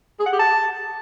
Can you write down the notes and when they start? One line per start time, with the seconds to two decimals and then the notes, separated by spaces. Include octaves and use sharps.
0.20 G#4
0.26 F#5
0.33 G4
0.39 A5